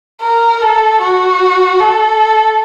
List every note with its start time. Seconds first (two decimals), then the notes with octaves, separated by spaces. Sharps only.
0.22 A#4
0.61 A4
1.01 F#4
1.80 A4